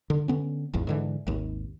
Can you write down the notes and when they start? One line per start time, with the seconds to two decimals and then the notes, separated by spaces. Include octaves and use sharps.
0.10 D3
0.28 D3 B3 C#4
0.73 D1 G#1 E2
0.87 G#2 D3 E3
1.27 G#1 D#2